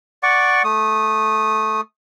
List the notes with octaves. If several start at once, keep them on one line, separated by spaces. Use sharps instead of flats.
D5 F#5 C#6 D6
A3 D#6